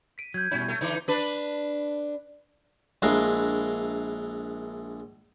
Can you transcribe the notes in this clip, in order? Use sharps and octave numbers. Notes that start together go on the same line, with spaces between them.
B6 D7 D#7
F#3 G6 G#6
B2 G3 C#4 E4
A3
D3 E3 D#4 E4 D5
D4 B4
A#1 G#3 D4 E4 A#4 F5